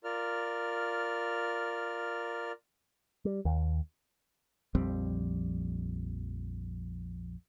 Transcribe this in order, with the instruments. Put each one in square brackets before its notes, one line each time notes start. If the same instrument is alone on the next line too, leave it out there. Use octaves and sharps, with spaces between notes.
[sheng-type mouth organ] F4 A#4 D5 F6
[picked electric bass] G3
D#2
[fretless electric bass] A#1 F2 G3 C4